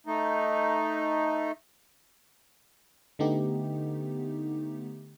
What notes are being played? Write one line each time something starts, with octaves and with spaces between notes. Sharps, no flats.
A3 D#4
D3 A3 B3 D#4 G4